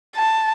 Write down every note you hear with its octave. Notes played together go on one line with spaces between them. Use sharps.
A5